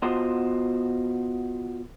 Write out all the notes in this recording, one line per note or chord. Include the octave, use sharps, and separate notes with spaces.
B3 F4 F#4 C5 D#5 C6